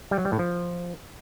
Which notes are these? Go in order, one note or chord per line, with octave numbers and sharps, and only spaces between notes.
G3
F#3
G3
A2
F3